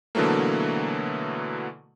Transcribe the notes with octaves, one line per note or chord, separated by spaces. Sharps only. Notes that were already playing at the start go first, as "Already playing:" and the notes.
B2 D3 E3 F#3 A3 A#3